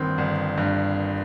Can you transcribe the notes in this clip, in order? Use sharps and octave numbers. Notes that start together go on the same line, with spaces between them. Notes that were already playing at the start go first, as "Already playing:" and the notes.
Already playing: G1 G2 D#3 C4
G1
G2